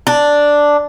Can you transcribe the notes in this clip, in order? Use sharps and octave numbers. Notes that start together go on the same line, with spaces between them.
D4